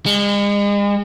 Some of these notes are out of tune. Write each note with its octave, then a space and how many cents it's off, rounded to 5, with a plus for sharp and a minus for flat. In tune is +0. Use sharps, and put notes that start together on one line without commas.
G#3 -40